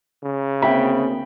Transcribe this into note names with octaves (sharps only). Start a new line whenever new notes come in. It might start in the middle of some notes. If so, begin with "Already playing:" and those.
C#3
D2 A#3 C4 E5 G5 B5